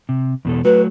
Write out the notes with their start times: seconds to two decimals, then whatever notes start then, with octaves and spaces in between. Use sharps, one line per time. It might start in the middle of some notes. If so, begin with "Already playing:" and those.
0.09 C3
0.45 E2 B2 A4
0.65 F#3 A3 F#4 B4